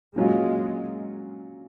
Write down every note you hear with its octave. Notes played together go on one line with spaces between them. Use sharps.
A#2 F#3 G#3 C#4 F4